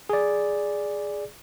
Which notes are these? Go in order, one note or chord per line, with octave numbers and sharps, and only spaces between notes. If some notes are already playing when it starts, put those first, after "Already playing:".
G#4 D5